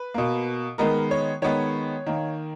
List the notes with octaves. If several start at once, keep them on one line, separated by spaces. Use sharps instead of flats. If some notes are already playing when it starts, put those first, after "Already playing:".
Already playing: B4
B2 A#3
D#3 G#3 B3 A#4
C#5
D#3 G#3 B3 C#5
D#3 A#3